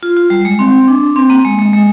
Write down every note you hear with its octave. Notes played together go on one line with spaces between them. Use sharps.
F4
F4
G3
G#3
C4
D4
C4
A#3
G#3
G#3
G#3